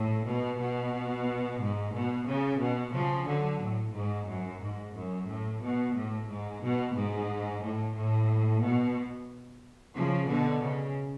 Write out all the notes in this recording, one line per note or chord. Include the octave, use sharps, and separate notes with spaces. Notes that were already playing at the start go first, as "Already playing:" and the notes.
Already playing: A2
B2
B2
G#2
B2
C#3
B2
C#3 F3
D3 F#3
A2
G#2
F#2
G#2
F#2
A2
B2
A2
G#2
B2
G#2
A2
A2
B2
C#3 F3
B2 D3
C#3